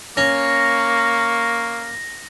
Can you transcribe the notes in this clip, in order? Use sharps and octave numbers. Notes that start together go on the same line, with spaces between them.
A#3 C#4 C#6 A#6